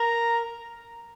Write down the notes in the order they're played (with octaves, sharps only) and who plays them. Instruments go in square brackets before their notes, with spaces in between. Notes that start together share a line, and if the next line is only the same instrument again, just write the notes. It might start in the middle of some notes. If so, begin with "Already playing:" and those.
Already playing: [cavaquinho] A#4 [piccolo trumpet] A#5